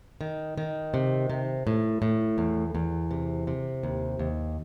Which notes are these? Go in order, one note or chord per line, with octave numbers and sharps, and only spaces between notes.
D#3
D#3
C3
C3
A2
A2
E2
E2
C3
C3
D#2
D#2